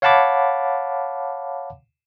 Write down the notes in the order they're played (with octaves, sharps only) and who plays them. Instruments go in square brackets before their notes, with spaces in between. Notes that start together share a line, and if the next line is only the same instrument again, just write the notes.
[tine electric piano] C#5 F5 F#5 A5 B5 D6